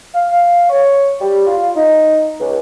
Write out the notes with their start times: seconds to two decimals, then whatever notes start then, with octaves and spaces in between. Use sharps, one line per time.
0.15 F5
0.70 C#5
1.21 G3
1.47 F4
1.75 D#4
2.40 C#2